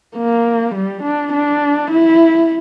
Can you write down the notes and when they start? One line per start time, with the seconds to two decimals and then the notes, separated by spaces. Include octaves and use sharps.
0.17 A#3
0.75 G3
1.03 D4
1.33 D4
1.91 E4